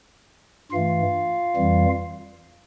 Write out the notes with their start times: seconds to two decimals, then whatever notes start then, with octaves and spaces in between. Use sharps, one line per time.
0.72 G2 E3 A3 F4 F5
1.56 F2 E3 G3